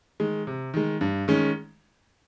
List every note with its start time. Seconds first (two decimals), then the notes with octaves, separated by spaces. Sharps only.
0.20 D#3 G#3
0.47 C3
0.74 D#3 G#3
1.01 G2
1.28 D#3 G#3 C#4